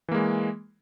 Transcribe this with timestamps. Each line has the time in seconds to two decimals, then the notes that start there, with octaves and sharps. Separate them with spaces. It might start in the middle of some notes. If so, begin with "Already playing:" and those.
0.08 E3
0.12 A#3
0.15 G#3